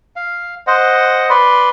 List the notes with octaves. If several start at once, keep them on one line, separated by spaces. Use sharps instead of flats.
F5
C5 D#5 F#5
B4 D5 B5 C6